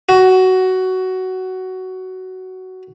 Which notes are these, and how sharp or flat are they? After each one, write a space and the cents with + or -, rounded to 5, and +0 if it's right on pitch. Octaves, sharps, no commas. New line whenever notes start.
F#4 +15